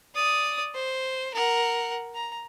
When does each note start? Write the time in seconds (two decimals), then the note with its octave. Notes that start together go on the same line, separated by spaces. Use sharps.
0.15 D5 D#6
0.74 C5
1.34 A#4 F#5
2.15 A#5